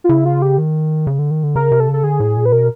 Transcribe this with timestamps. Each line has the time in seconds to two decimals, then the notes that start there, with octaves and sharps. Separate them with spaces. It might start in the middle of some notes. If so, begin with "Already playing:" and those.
0.04 F4
0.09 C#3 E4
0.25 F4
0.42 G4
0.58 D#3
1.07 C#3
1.19 D3
1.31 D#3
1.43 D3
1.55 C#3 A#4
1.72 C3
1.80 A4
1.87 C#3
1.93 A4
2.03 D3 G#4
2.20 A2
2.37 A#2
2.46 B4
2.52 B2 A#4